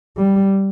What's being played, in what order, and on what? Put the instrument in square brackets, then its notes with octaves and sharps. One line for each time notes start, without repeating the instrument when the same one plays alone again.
[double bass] G3